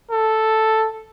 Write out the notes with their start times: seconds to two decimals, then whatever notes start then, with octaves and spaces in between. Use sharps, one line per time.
0.11 A4